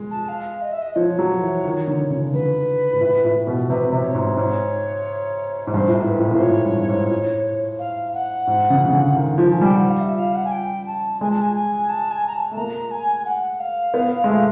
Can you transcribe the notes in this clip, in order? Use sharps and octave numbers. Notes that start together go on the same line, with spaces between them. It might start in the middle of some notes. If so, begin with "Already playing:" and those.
Already playing: G#3
A5
F5
D#5
E5
D#5
F3 C#5
F#3
E3
D#3
D3
C#3
D3 B4
G#2
A2
A2
B2
C3 B4
C3
C#5
G#2
G#2 C#5
G#2
G2 C5
A2
G#2
B4
A2
A#2
A2 C5
G#2 C#5
G2
G2
G#2
A2
F5
F#5
G#2
C#3
C#3
D3
D#3
F3
G#5
G3 G5
F#5
F5
E5
F5
F#5
G#5
G5
A5
G#3 G#5
A5
G#5
G#5
A5
G#5
A#5
A5
A3
A#3 A#5
G#5
F#5
F5
B3
G#3
A3